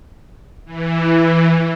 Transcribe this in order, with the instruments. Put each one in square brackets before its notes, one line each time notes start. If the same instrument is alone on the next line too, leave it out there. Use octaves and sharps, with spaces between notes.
[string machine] E3